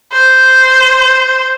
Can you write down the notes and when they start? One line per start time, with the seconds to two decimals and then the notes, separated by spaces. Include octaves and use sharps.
0.13 C5